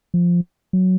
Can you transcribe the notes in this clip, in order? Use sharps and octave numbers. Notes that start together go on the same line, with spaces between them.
F3
F#3